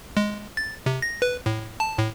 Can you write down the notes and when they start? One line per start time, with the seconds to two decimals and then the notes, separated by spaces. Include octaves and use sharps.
0.17 G#3
0.57 A6
0.86 C3
1.02 A#6
1.22 B4
1.46 A2
1.80 A5
1.98 A2